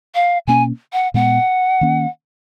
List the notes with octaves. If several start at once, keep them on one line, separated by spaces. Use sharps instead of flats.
F5
B2 A#3 C#4 G#5
F#5
A#2 G#3 B3 F#5
D#3 A#3 C#4